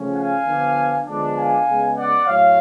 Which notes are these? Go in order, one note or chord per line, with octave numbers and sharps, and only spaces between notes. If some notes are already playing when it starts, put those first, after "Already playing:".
Already playing: C#3 F3 A3 C#4
F5 G#5
D3 F3 B3 D4
D3 F3 G#3 B3 D4
F5 G#5
C#3 G#3 B3
D5 F#5
A2 F#3 A3 C#5 F5